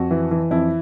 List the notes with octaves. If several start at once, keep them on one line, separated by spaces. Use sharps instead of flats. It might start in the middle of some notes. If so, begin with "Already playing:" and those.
Already playing: F2 F#4
E3
E3
F2 E4